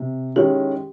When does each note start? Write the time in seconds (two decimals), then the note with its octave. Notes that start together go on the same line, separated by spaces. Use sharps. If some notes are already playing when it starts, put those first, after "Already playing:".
Already playing: C3
0.36 D#3 G#3 C#4 E4 G4